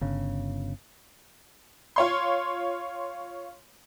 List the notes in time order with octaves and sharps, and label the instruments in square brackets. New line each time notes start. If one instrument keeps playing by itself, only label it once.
[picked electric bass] G1 C#3
[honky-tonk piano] F4 C#5 C6